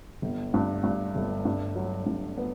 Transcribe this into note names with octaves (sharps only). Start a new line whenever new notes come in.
G1
G2
G2
G1
G2
F#3
G2
B3